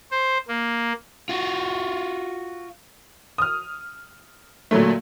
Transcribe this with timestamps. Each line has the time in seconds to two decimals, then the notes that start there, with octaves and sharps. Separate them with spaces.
0.11 C5
0.48 A#3
1.29 F4 F#4
3.38 D#6 F6
4.71 A#2 D3 F#3 A3